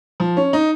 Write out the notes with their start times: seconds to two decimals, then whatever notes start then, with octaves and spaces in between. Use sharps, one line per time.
0.20 F3
0.37 C#4
0.53 D#4